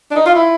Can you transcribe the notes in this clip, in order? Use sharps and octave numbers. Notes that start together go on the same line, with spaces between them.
D4
D#4
F4
E4